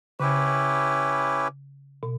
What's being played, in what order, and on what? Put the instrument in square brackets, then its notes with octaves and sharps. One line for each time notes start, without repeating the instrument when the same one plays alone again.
[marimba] C#3 [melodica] C#4 E4 G4 B4
[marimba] B2